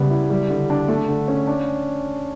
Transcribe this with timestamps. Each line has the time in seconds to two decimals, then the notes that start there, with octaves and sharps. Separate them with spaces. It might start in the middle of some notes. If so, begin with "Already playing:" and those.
Already playing: C#3 G3 B3
0.10 E4
0.30 G3
0.50 D3
0.70 D4
0.88 A3
1.08 D3
1.28 C#4
1.47 D4